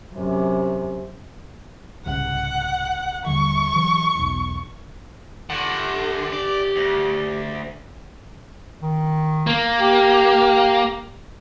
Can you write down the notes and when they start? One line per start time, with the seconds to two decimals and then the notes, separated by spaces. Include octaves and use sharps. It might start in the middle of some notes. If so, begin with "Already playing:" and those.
0.14 F#2 C3
2.06 C2 G#2 C#3 F#5
3.26 D#1 D3 G3 C#6
3.76 E3 F#3
4.15 E1 B1
5.50 D3 G4 F#5
6.33 D5
6.76 D2
8.82 D#3
9.47 A#3
9.80 G4